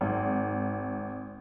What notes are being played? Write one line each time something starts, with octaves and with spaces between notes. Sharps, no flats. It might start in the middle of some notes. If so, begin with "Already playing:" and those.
G#1